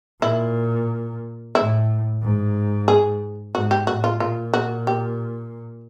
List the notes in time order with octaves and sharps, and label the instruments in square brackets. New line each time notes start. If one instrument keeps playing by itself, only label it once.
[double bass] A#2 [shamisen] E4
[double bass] A2 [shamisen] E4
[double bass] G#2
[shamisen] G#4
[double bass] G#2 [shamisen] F#4
[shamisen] G4
[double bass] A2 [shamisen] F#4
[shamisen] F4
[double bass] A#2 [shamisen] F4
[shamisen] F#4
G4